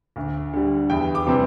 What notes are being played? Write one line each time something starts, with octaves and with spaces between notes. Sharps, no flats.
D2
D3 G3
E2 G5
D6
C3 E3 G3 C4